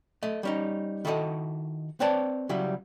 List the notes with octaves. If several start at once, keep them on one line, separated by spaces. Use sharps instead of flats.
A3 D#5
G3 C#4 D#4
D#3 E4 F#4 A4 C#5 D#5
C4 B4 C#5 D5 A5
C#3 F#3 G3 E4